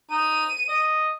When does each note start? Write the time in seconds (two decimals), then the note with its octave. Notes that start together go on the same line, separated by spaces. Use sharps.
0.11 D#4 D#7
0.69 D#5